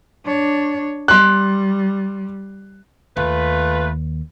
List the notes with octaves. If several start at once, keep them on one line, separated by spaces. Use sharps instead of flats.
D4 C#5
G3 C6 F#6
D#2 A3 F4 B4